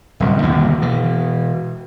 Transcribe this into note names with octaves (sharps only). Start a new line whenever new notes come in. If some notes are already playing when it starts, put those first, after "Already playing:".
D1 C2 F#2
G1 D#2 B2
B2 E3